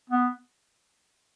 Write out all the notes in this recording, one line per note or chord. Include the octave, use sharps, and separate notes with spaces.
B3